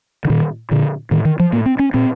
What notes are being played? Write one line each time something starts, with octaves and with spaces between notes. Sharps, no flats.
D3
A#2 D#3
A#2 D3
A2 D#3
D#3
F3
A2 A#3
C4
C#4
A#2 C4